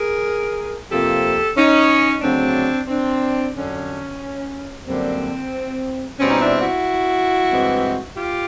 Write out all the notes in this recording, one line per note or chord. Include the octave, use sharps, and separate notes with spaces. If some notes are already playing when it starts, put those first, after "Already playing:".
Already playing: G#4 A#4
F2 C3 F3 A#3 G4 A4
C#4 D#4
D2 C#3 F#3 C4 D4
C4 D4
F2 D3 F#3 C#4
F#2 D3 G3 A#3 C4
B2 G3 C4 C#4
D#4
D4 E4
E4 F#4
G2 E3 G#3 C4
F4 G4